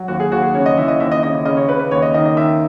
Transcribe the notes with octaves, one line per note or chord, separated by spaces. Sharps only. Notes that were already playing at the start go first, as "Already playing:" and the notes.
Already playing: F#3
D#2 F#4
G#4
D#2 F#4
G#4
C#3 C#5
D#5
E3 E5
D#5
D#2 E5
D#5
C#3 D#5
D#5
C#3 D#5
C#5
C#3 B4
B4
D#2 C#5
D#5
D#3 D#5
D#5
D#3 E5